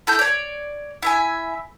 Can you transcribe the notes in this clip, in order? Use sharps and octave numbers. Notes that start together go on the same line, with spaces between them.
E4 A4 G6
C#5 D5
E4 E5 G#5